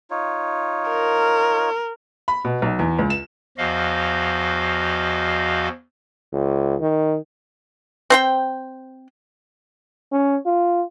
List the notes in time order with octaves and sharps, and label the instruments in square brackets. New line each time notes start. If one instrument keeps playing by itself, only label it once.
[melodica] D#4 F4 C#5
[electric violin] A#4
[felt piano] B5
B2
B1
E2
C#2
E7
[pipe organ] E2 F3 F#4 D#5 F5
[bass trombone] C#2
D#3
[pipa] C4 C5 G5
[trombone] C#4
F4